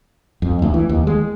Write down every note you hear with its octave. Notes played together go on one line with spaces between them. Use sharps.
F2
D2
E3
D#2
G#3